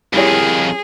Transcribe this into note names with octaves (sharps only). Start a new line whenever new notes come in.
F2 D#3 G3 E4 G#4 C#5